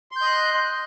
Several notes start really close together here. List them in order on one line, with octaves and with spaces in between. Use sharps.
C6 G6 D#5 F#6